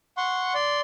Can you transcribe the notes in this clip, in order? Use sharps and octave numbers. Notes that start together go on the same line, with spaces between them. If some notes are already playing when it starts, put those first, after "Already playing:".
F#5 C6 C#6
D5 C6